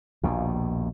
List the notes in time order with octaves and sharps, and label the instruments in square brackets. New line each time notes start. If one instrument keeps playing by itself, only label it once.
[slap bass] A#1 D#2 B2